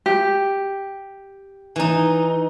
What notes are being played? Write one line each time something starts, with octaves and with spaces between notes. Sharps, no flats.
G4
E3 D#4